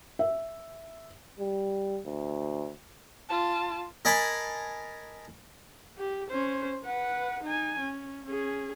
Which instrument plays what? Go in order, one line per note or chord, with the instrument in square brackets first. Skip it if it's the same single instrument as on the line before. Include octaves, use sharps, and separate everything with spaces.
[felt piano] E5
[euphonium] G3
D2
[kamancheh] F4 A5
[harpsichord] A#4 D#5 G#5 A5 B5 C6
[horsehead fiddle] G4
C#4 C5
B4 F#5
D#4 G#5
C#4
C#4 G#4